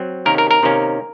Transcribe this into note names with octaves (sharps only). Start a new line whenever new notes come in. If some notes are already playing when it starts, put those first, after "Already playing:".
Already playing: F#3 C4
C3 D#3 A#3 C#4 A#4
A#4
A#4
C3 D#3 A#3 C#4